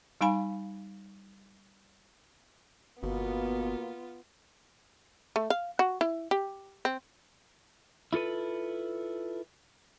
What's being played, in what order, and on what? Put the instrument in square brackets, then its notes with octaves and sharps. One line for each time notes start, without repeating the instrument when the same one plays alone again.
[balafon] G3 D#4 F5 G#5 B5
[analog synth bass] G1 [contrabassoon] B2 [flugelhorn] A#3 [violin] B3 F4
[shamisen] A3
F5
F#4
E4
G4
C4
[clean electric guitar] E4 F4 A4 B4